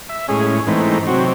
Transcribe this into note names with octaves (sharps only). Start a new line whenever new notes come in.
E5
A2 G#3 C#4 G#4
G#2 E3 A3 C4 D#4
C3 F#3 C4 F#4